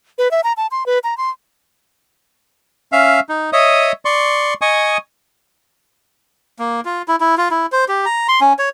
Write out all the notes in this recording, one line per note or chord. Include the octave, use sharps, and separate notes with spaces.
B4
E5
A#5
A5
C6
B4
A#5
C6
C#4 E5 F5
D#4
C#5 D#5 E5 D#6
D5 C6 C#6
D#5 G#5 C#6 D#6
A#3
F4
E4
E4
F4
E4
C5
G4
A#5
C6
C#4
C#5